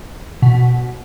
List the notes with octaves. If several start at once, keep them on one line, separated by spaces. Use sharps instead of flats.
B2